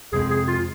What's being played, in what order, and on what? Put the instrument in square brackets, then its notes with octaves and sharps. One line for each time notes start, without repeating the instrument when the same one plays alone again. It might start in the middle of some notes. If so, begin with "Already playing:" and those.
[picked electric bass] F2 C3 G#3 C4 [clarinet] G#4
[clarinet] G#4
F4